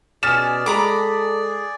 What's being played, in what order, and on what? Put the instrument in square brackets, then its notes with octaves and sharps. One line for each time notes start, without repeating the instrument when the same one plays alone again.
[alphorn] B2 [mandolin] C#4 [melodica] G#4 D5 [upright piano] F6 A6 E7
[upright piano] G#3 [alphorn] A4 [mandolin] A#5 B5 D6